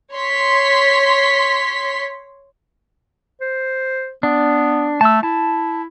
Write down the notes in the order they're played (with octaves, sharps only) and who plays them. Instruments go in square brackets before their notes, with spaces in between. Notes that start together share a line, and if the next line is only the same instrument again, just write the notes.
[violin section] C#5 C6 B6
[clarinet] C5
[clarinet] B3 [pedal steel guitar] D4
[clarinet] A3 [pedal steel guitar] A5 E6
[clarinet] E4 [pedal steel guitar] A5